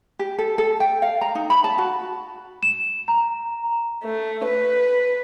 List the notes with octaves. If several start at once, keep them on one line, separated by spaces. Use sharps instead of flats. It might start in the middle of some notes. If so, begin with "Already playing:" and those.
G4
A4
A4
G5
F5
A#5
D#4
B5
A5
F#4
E7
A#5
A3
B4